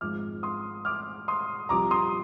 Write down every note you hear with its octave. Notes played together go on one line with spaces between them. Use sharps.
G#1 G#2 F3 D6 F6
C6 D#6
D6 F6
C6 D#6
C2 C3 F3 A#5 D6
C6 D#6